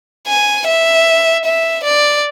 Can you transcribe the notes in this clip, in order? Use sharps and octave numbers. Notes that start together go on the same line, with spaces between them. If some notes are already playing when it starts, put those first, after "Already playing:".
G#5
E5
E5
D5